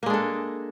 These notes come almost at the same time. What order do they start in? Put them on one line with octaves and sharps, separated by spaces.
A#3 G#3 D4 A4